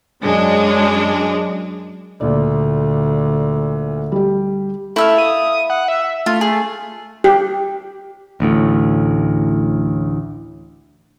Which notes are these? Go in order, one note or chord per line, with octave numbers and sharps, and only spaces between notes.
F#2 G#3 D4
D2 A#2 D5
G3 G4
A3 E4 E5 F5
D#6
F#5
E5
A3 F4
G#4
G4
A1 D2 A2